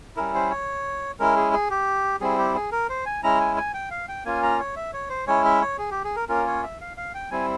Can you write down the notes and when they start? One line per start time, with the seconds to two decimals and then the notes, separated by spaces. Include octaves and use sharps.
0.16 G3 C#4 E4 A#4
0.35 C5
0.50 C#5
1.19 G#3 C#4 E4 A#4
1.37 G#4
1.53 G#4
1.70 G4
2.21 G3 C4 E4 G#4
2.38 G4
2.55 G#4
2.72 A#4
2.89 C5
3.06 G#5
3.23 G#3 C#4 E4 A#5
3.40 G#5
3.57 G#5
3.74 G5
3.91 F5
4.08 G5
4.25 A#3 C#4 F4 G#5
4.43 A#5
4.60 C#5
4.76 E5
4.93 C#5
5.10 C5
5.27 G#3 C#4 E4 C#5
5.45 E5
5.61 C#5
5.78 G#4
5.91 G4
6.04 G#4
6.16 A#4
6.29 A#3 C#4 F4 A#4
6.47 C#5
6.63 E5
6.81 F5
6.97 F5
7.15 G5
7.31 G3 C4 E4 G#5